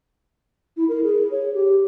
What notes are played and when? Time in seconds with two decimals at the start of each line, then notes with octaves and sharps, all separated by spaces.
0.77 E4
0.89 A#4
1.03 G#4
1.31 C#5
1.54 G4